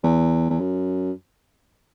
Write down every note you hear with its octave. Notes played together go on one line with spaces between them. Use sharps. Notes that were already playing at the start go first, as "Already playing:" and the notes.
E2
E2
F#2